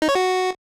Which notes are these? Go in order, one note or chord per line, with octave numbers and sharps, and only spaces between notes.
D#4
C#5
F#4